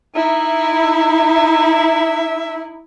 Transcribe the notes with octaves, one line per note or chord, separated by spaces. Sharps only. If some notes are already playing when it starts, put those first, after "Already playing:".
D#4 E4 E5